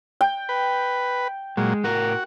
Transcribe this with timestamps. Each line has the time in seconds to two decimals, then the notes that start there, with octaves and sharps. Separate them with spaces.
0.21 G5
0.49 B4
1.57 A#2 F#3 G#3
1.84 A2 F#4 A#4